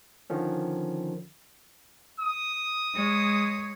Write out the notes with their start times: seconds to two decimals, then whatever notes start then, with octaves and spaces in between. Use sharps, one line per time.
0.30 D3 D#3 F3 C#4
2.20 D#6
2.94 G#3 C#5